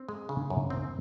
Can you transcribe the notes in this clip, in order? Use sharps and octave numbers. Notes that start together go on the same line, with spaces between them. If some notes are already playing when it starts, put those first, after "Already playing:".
Already playing: C4
G#3
C#3
F#2
C4